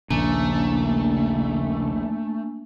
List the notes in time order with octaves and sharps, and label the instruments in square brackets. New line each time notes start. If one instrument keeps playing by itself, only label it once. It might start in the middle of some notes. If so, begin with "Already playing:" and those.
[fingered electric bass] A#1 D#2 [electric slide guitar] C#3 [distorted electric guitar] A3 [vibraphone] A#3 D4 G#5